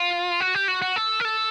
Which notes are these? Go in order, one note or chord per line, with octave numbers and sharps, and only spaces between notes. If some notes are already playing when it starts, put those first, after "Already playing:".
Already playing: F4
F#4
G4
F#4
F#4
A4
A#4
A4